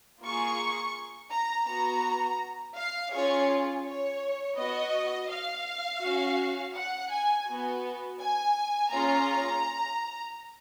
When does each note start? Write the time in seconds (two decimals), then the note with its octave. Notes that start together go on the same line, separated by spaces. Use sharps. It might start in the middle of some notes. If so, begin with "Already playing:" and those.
0.23 A#3 F4 G#4 C#6
1.31 A#5
1.67 B3 F#4 A#5
2.76 F5
3.12 C#4 F4 G#4 C#5
3.85 C#5
4.57 B3 F#4 D#5
5.30 F5
6.02 C#4 F#4
6.75 F#5
7.10 G#5
7.46 B3 F#4
8.19 G#5
8.91 A#3 C#4 F4 G#4 A#5